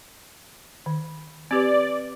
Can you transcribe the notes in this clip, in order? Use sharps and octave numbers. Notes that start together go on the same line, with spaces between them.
D#3
C4 G4 B4 D5